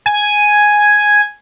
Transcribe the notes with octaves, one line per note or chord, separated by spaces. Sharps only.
G#5